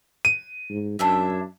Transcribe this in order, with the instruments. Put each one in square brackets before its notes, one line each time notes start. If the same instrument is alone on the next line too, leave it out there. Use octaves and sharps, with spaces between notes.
[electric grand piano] D#7
[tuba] G#2
[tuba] F#2 [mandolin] D4 E4 E5